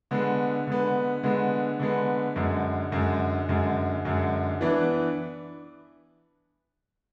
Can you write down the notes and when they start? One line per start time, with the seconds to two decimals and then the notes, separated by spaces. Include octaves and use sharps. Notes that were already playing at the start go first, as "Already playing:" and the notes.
0.11 D3 G#3 B3
0.67 D3 G#3 B3
1.23 D3 G#3 B3
1.79 D3 G#3 B3
2.36 F#2 D3 G#3
2.92 F#2 D3 G#3
3.49 F#2 D3 G#3
4.05 F#2 D3 G#3
4.61 E3 B3 D4